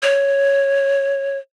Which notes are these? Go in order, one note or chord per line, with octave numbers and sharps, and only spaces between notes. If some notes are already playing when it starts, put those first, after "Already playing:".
C#5